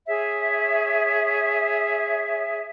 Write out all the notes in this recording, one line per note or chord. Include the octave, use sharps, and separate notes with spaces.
G#4 C#5 E5